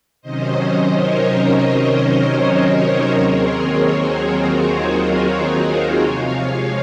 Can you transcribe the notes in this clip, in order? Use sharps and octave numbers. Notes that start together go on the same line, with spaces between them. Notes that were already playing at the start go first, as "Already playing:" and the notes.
C3 D#3 F#3 C#4 C5 D#5
C5 D#5
A#4 C#5
D#2 D#3 F#3 C4 G#4 C5
F#4 A#4
F4
D#4
F4
A#4 C#5
C3 F3 G#3 C#5 F5